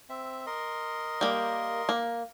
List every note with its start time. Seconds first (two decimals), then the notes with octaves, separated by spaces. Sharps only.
0.10 C4 E5
0.47 A#4 D#5 C6
1.21 G3 A#3
1.89 A#3